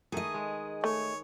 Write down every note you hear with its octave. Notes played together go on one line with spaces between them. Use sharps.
D#3 A3 G#4 D#5
G#3
A3 C#5